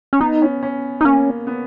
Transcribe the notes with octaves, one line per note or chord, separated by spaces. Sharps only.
C#4
B3 D#4
C#4
C#4
D#4
A#3 C#4
B3